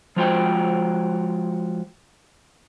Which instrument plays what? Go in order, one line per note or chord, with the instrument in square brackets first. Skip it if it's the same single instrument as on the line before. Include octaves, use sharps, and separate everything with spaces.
[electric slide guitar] F3 G#3 F4 F#4 C5 G5